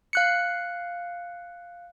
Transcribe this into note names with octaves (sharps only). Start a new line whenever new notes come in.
F5 F#6 C#7